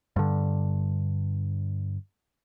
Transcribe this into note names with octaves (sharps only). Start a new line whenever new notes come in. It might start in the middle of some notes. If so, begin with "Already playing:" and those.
G2 D3